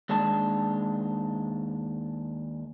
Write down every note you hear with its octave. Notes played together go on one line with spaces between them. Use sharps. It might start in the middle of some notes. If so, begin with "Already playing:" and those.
D#2 G#3 D4 A5